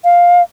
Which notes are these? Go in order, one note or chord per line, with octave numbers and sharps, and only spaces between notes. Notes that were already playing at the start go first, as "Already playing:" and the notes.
F5